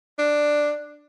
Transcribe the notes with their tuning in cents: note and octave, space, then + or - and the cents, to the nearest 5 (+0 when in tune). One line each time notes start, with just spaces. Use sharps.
D4 +5